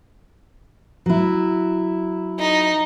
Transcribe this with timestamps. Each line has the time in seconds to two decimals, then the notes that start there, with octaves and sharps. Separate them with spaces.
1.06 F#3 E4
2.40 D#4